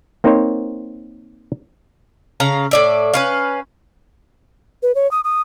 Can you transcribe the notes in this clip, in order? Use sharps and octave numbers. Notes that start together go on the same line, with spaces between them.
A#3 C4 D#4 A#4 C5 C#5
C#3 F5 A#5
A2 D5 E5
C#4 B4 F5
B4
C#5
D#6
D#6